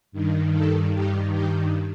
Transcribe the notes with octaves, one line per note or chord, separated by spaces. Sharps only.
G2 D#3
A4
G2 D#3 G4
G4